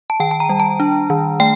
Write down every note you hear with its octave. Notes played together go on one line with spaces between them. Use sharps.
A5
D#3 G5
A5
A#5
G3
A5
D4
D#3
A3 G5